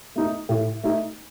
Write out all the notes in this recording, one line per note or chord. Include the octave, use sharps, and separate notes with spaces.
A3 D#4
A2
A3 D#4